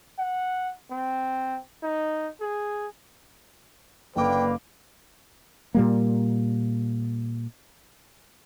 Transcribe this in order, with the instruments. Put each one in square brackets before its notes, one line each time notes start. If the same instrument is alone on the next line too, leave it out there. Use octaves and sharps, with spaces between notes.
[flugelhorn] F#5
C4
D#4
G#4
[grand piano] F#1 D6 [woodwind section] D3 A#3 [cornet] B4 [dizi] G5
[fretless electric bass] A#2 G3 A#3